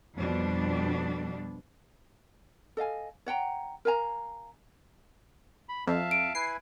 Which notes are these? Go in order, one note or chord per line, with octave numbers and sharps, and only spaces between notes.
F2 B2 G3 D4
A4 D#5 F5 G#5
C#5 F#5 G5 A#5
A#4 F5 G#5 A#5
B5
F2 E5 F5 A5
D7
E4 B4 G#5 C7